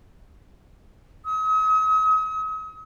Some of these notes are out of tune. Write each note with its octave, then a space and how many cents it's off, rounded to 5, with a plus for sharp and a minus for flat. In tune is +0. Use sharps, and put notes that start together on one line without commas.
D#6 +40